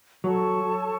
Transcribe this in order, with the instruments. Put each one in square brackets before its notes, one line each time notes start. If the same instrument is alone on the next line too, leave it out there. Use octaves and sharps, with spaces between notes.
[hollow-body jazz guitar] F#3 [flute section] A4 C#5 A5 C#6